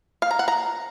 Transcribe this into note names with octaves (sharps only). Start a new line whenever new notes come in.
F5
A#5
F#5
A#5